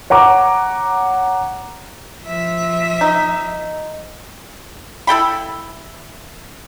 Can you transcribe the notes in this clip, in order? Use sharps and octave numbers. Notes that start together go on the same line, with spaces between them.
C#5 F#5 A#5 D6
F3 E5
D#4
E4 A4 G5 B5